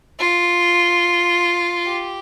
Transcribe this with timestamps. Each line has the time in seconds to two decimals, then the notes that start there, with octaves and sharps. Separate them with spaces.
0.19 F4
1.86 G4